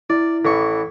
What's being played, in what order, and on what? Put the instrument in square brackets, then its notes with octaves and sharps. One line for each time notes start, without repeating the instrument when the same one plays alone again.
[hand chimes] E4 [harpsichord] D5
[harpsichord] A1 E3 C#6 [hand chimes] A4